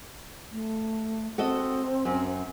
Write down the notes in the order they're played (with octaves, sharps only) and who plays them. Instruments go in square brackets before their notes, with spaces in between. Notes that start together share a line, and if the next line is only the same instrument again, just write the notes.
[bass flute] A3
[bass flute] C4 [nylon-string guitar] F#4 A4 D#5
[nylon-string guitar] F#2